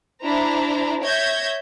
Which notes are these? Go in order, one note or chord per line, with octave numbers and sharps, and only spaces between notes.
D4 E4 C5 A#5
C#5 E5 G6 G#6 A#6